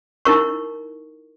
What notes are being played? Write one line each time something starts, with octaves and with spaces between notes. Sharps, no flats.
D#4 E4 A#4 C#6